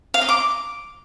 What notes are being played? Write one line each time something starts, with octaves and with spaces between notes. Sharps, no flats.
F5
D#5
D6